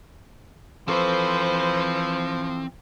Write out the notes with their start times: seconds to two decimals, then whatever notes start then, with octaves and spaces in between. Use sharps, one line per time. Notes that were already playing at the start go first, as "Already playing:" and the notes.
0.88 E3 F3 C4 A4 B4 C5 C#6